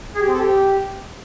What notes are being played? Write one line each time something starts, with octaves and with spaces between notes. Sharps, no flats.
G#4
G4
C4
A4
G4